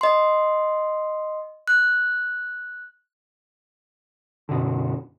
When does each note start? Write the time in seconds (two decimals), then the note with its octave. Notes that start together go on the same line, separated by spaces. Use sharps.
0.01 D#5 C6
1.68 F#6
4.49 F#2 B2 D3